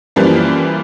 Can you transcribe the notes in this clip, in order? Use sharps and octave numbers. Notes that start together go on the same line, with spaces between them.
F#2 E3 F3 G3 A#3